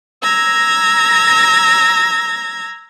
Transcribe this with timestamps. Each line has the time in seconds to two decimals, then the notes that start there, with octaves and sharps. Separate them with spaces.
0.23 A#5 E6 G#6 A#6